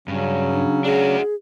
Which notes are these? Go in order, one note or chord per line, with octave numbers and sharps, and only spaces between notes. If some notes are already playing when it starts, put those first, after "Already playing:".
G2 C#3 F#3 C#4
D4
D4 F#4 G#4